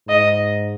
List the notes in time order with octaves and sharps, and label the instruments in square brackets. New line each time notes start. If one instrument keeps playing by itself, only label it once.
[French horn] G#2 [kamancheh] D#5